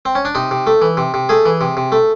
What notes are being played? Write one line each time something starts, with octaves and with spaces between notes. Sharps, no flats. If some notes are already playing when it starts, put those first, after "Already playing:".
C4
C#4
D4
C3 D#4
C3
A3
E3
C3
C3
A3 G#4
E3
C3
C3
A3